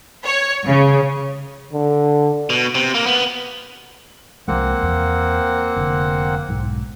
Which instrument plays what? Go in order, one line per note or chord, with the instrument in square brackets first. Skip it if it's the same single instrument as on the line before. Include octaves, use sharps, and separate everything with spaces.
[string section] C#5
C#3
[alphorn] D3
[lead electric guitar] B2
C3
A#3
B3
[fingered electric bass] C2 F3 G#3 [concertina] A#3 C4 F#5
[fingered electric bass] E2
F1 D3
B1 G#2